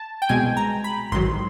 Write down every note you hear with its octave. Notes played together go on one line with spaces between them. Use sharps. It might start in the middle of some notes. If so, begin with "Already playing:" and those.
Already playing: A5
G5
C2 B2 G#3 G#5
A#5
B5
A1 G#2 D#3 F#3 C6